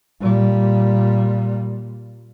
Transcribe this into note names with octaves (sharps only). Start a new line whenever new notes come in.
A#2 G3